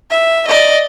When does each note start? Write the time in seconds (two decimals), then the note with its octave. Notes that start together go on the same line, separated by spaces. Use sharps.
0.11 E5
0.48 D5 D#5